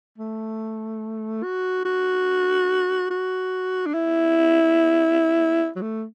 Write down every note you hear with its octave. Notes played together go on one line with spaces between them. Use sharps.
A3
F#4
F#4
F#4
D4
E4
F#3
A3